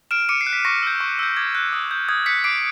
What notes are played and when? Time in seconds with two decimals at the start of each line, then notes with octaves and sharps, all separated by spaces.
0.11 F6 D7 E7
0.29 D6 C#7 D#7
0.41 C7
0.47 F#6
0.53 B6
0.65 C#6 A#6
0.83 E6 G6
1.01 C#6
1.19 E6 G6
1.37 D6 G#6
1.55 F#6
1.73 D#6
1.91 G6
2.09 D#6 G#6
2.26 F#6 B6 C#7
2.44 D6 C7 D7